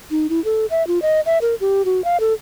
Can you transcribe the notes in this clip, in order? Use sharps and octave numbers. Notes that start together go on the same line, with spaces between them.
D#4
E4
A4
E5
F4
D#5
E5
A#4
G4
F#4
F5
A4